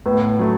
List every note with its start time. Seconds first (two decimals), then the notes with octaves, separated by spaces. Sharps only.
0.06 A2 B3
0.39 F#3 A3